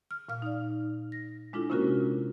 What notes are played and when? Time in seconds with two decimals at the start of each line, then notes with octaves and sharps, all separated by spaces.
0.11 F6
0.29 A#2 F5 F6
0.42 D#4 D5
1.12 A#6
1.53 G#3 D4 E4 F4 A4
1.70 C3 A#3 C#4 F4 F#4 A#4